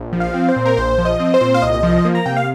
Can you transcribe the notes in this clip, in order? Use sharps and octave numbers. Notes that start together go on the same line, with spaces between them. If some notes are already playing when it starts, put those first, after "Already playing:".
Already playing: A#1
F3
F5
C4
C5
A#2
A#4
A#1 C5
F3
D#5
C4
C5
A#2
F5
C2 D#5
F3
A#3
A#5
C3 G5
F5